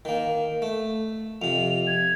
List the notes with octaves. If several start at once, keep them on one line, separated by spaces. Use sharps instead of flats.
D#3 A#3
A3
F2 C3 F7
G#6